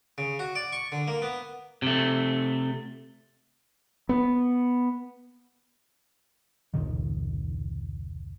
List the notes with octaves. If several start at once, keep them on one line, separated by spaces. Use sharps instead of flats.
C#3
F#4
D5
C#6
D3
A#3
B3
C3 A3
B3
F1 C#2 A#2 D#3